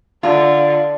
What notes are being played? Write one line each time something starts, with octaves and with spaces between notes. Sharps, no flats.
D3 F4